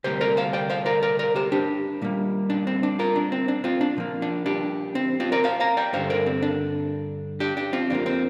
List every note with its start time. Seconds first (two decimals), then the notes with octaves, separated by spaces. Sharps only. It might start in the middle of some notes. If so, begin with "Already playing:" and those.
0.04 D2 C3 G3 A#3 G4 C5
0.21 A#4 D5
0.37 C5 F5
0.53 D5 G5
0.70 C5 F5
0.86 A#4 D5
1.03 A#4 D5
1.19 A#4 D5
1.36 G4 C5
1.52 D4 G4
2.02 A#2 G3 A#3
2.50 D4
2.67 C4
2.83 D4
2.99 F4 A#4
3.16 D4
3.32 C4
3.48 D4
3.64 C4 F4
3.81 D4
3.97 A#2 F3 A#3
4.22 D4
4.46 D4 G4
4.95 C4
5.20 C4 F4
5.32 A#4 D5
5.44 C5 F5
5.60 F5 A#5
5.77 D5 G5
5.93 G2 D3 G3 C5 F5
6.10 A#4 D5
6.26 C4
6.42 D4
7.40 D4 G4
7.57 D4 G4
7.73 C4 F4
7.90 F2 F3 A#3 D4
8.06 C4